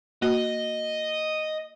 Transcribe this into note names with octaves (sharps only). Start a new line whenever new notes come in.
A#3 F#4 D#5